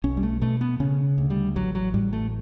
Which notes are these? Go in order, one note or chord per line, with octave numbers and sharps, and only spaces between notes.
B1 C#4
G3
A3
B2 A3
B3
C#3 C#4
D2
G3
A1 F#3
F#3
A2 G3
A3